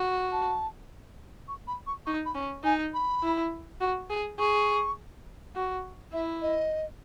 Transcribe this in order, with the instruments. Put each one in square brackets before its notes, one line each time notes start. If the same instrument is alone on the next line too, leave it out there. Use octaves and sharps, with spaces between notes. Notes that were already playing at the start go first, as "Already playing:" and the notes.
Already playing: [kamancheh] F#4
[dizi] A5
C#6
B5
C#6
[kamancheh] D#4 [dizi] C#6
[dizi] B5
[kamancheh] C#4
[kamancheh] D#4 [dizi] G#5
[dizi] B5
[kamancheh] E4
F#4
G#4
[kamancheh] G#4 [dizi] C#6
[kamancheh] F#4
[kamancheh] E4 [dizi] E5
[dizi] D#5